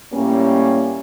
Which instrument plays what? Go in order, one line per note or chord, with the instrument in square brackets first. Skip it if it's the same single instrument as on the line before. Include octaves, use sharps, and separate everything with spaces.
[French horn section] A2 G3 A#3 C#4